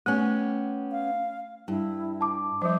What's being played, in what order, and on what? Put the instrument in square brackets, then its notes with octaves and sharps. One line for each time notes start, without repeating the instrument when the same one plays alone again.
[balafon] A3 [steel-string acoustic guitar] B3 C#4 G4
[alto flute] F5
[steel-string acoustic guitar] G2 [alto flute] E4
[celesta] A5 D6
[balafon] F3 G3 [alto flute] C5